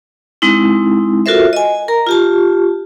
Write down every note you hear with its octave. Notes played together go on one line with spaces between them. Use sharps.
G#3 C4 D#4 E4
F4 F#4 A4 A#4 C5 E5
D#5 G#5
A#4 A#5
F4 G4 A5